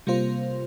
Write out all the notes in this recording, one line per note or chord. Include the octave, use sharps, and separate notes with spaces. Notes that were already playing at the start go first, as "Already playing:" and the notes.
C3 G3 A#3 F4 C5